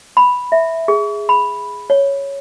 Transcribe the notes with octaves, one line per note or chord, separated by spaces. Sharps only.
B5
E5
G#4
B5
C#5